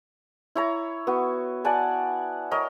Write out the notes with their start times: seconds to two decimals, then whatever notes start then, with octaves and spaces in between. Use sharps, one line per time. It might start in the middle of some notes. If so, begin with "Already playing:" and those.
0.55 E4 C#5 A#5
1.07 B3 F#4
1.64 D5 F#5 G#5 A5
2.51 A#4 C#5 D#5